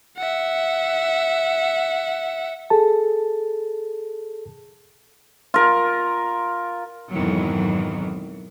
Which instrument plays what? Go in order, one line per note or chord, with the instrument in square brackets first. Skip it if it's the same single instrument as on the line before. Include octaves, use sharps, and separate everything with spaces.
[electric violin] E5 F#5
[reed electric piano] G#4 A4 A5
[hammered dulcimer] F4 A#4
[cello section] F2 G#2 B2 D#3 E3 F#3